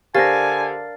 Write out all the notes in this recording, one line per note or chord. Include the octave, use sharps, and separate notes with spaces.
D3 G4 A#4 C5 F5 G#5 A6 A#6